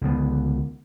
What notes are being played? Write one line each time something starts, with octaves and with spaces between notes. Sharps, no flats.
C#2 D3 B3